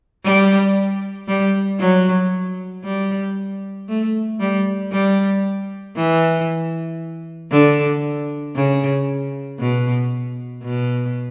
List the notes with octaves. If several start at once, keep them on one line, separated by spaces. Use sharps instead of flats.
G3
G3
F#3
G3
A3
G3
G3
E3
D3
C#3
B2
B2